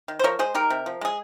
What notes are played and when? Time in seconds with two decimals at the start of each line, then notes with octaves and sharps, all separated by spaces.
0.08 D#3
0.19 C5
0.24 F3 A#4 C#5
0.39 G#3 G#4 C5
0.54 D#4 G4 A#4
0.70 C3
0.86 F3
1.01 G#3 G#4